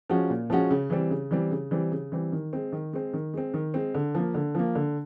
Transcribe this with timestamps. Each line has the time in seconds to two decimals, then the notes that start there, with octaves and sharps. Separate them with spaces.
0.09 F3 G#3 C#4 F#4
0.30 A#2
0.50 F3 G#3 C#4 F#4
0.71 C#3
0.90 E3 G3 C4
1.10 C#3
1.31 E3 G3 C4
1.51 C#3
1.71 E3 G3 C4
1.92 C#3
2.12 E3 G3 C4
2.32 D#3
2.53 G#3 C4
2.72 D#3
2.93 G#3 C4
3.13 D#3
3.34 G#3 C4
3.54 D#3
3.74 G#3 C4
3.95 D3
4.15 F3 A#3
4.35 D3
4.55 F3 A#3
4.75 D3